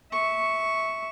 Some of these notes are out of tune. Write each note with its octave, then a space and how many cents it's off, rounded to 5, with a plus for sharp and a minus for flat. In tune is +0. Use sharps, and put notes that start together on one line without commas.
E5 -15 C#6 +0